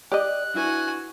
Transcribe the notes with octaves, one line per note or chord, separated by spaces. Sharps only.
G4 D5 D#5 F#6
D4 E4 F#4 B4 G#5